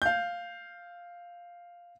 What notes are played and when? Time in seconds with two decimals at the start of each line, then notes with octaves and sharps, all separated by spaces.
0.02 F5 G6